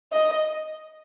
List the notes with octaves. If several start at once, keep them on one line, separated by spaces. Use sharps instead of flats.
D#5